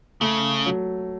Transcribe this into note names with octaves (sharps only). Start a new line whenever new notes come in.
C#3 A3
F#3